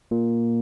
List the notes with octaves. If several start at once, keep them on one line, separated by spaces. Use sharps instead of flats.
A#2